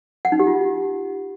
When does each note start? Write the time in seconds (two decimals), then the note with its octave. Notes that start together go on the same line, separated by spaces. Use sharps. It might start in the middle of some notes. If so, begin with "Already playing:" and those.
0.25 F#5
0.32 D#4
0.39 G4
0.47 F4